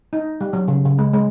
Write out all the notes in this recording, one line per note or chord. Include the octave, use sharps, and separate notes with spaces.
D#4
G3
F#3
C#3
C#3
G#3
G#3